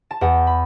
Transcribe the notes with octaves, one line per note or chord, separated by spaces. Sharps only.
A5
E2 F#5
B5